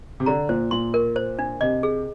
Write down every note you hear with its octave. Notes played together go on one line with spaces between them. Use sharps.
C3
D3 A#5
A#2 C5
A#2 C6
A#4
C5
D4
C3 D#5
G#4